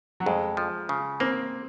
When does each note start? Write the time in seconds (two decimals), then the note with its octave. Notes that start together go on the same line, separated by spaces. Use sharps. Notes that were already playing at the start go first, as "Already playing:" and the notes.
0.20 F#3
0.26 F2 G#3
0.57 F3
0.89 C#3
1.20 A#3 C4